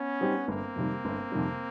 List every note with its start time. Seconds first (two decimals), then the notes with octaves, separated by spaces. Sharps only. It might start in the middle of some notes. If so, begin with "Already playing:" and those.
Already playing: B3 C#4
0.21 G3 C4 D#4 G4
0.48 G1 A#3 C4
0.76 F2 C3 D#3 G3
1.05 G1
1.32 F2 C3 D#3 G3